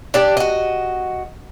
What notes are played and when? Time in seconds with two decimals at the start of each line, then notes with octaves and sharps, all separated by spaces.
0.14 D4 G4 D5
0.37 F#4 D#5